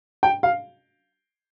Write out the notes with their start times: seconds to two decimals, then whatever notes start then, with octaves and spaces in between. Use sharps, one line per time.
0.23 G5
0.43 F5